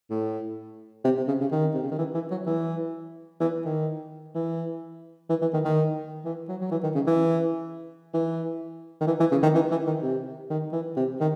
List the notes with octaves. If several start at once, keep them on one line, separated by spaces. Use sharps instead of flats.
A2
C3
C3
C#3
C#3
D#3
C3
C#3
D#3
E3
E3
F#3
E3
E3
D#3
E3
E3
E3
D#3
D#3
E3
F#3
F#3
E3
D#3
C#3
E3
E3
D#3
E3
E3
C#3
D#3
E3
E3
D#3
C3
D#3
E3
C3
D#3